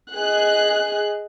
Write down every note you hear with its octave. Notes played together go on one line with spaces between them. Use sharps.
G#4 D#5 F#6